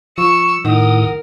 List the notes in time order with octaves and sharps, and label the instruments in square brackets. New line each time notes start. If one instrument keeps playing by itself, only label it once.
[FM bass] F3 [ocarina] C#6 [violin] E6 C#7
[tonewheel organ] A2 D#6 [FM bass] D#3 [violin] A#4 [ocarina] F#5